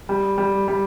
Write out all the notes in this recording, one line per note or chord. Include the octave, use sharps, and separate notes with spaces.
G3
G3
G3